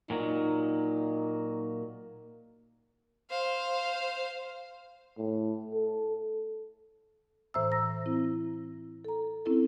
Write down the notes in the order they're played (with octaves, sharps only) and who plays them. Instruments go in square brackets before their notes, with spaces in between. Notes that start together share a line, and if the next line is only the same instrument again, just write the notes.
[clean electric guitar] A#2 F#3 [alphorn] D#4
[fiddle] C5 F5
[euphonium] A2
A4
[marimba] A2 E3 C5 E5 A#5 E6
A#5 E6 A#6
C4 E4
A4 A#5
C4 C#4 E4 A4